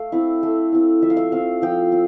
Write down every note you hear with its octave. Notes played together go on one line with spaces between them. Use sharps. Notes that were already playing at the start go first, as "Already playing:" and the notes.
Already playing: A3 F5
C4 E4
A3
C4 E4
F3 E5
F5
E5
C4 F4 F5
F3 G5
C4